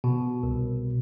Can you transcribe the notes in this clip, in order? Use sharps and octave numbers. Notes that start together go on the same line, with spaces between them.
B2
C2